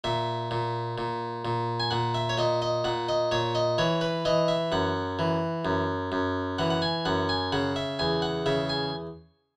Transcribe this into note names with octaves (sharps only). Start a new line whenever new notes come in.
A#2 E5
A#2
A#2
A#2
G#5
A#2 F#5
E5
C#5
A#2 D#5
D#5
A#2 F#5
D#5
A#2 C#5
D#5
E3 C#5
B4
E3 D#5
E5
F#2 F#5
E3
F#2
F#2
E3 F#5
F#5
G#5
F#2 F#5
G#5
C#3 F#5
E5
E2 G#5
F#5
C#3 E5
G#5